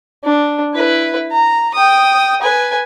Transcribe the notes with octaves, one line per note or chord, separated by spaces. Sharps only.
D4
E4 B4
A#5
G5 D#6
B4 G#5